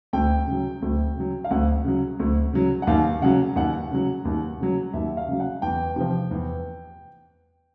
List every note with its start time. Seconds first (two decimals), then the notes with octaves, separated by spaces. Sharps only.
0.13 D2 G5
0.47 C#3 F#3
0.82 D2
1.16 C#3 F#3
1.44 F5
1.51 D2 F#5
1.84 C#3 F#3
2.20 D2
2.53 C#3 F#3
2.82 F#5
2.87 D#2 F5
3.22 C#3 F#3 F#5
3.56 D#2 F#5
3.91 C#3 F#3
4.25 D#2
4.59 C#3 F#3
4.93 D#2 E5
5.17 F5
5.28 C#3 F#3
5.40 F#5
5.62 E2 G5
5.96 C3 F3
6.31 E2